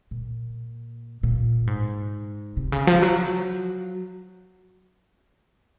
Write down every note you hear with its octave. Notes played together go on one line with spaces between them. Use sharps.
A#2
A#2
G#2
C3
C#3
F3
F#3